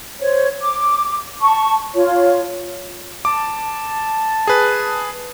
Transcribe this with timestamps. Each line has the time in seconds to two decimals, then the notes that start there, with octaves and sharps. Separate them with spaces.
0.20 C5 C#5
0.61 D6
1.41 A5 C#6
1.95 F4 C#5
3.25 A5 D6
4.47 G#4 B4